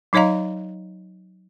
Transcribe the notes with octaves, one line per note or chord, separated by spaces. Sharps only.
F#3 D#4 C#5 D#5 F5 A#5